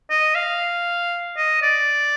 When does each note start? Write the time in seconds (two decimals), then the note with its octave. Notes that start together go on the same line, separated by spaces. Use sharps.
0.10 D#5
0.35 F5
1.37 D#5
1.62 D5